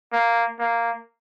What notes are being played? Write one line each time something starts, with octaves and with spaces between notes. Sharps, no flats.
A#3
A#3